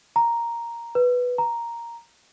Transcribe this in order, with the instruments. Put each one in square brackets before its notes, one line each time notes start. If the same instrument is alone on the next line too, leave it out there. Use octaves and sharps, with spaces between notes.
[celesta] A#5
B4
A#5